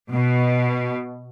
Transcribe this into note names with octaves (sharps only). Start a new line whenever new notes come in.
B2